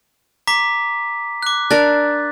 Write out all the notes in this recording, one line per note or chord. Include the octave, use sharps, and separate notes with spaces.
A#5 D6 B6
D6 F#6
D4 A#4 F#6 A6